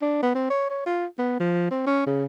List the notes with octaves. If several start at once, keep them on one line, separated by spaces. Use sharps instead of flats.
D4
B3
C4
C#5
C#5
F4
B3
F3
C4
C#4
C#3